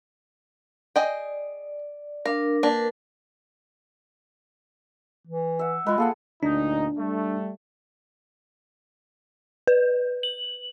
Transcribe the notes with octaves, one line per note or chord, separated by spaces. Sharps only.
G#4 D5 D#5 G5
D4 A#4 F5
A#3 D4 A#4 B4
E3
E5 F#5
G#3 F4 B4
A#3 G#4 A4 F#5
D2 A#2 D4 D#4
G3 A3
B4
F#7